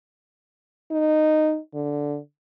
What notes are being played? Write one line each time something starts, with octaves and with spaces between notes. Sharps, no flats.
D#4
D3